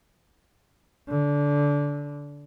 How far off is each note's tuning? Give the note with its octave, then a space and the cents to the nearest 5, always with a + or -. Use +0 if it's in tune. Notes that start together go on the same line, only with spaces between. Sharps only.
D3 -20